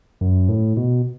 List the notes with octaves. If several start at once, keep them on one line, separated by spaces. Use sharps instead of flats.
F#2
A2
B2